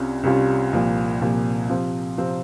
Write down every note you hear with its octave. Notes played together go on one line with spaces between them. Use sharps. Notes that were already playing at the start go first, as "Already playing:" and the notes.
Already playing: C2 C3 G3 C#4 F4
C2 C3 G3 C#4 F4
C2 A#2 F3
C2 A#2 F3
C3 F3 C4
C3 F3 C4